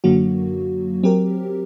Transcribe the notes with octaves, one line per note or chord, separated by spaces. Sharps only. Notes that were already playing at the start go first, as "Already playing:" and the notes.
F#2 D3 F#3 A#3 F#4
F#3 C4 G4 A#4